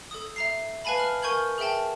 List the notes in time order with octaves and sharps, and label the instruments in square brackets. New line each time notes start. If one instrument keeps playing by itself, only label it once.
[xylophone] A4 D#6
E5 A#5 C7
B4 F5 G#5 A5 B5
F6 F#7
A#4 G#5 C#6 G6 G#6 F#7
G#4 A#4 E5 G5 A5